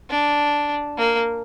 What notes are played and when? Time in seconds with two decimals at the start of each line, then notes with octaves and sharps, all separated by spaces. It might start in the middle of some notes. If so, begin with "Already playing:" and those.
0.10 D4
0.97 A#3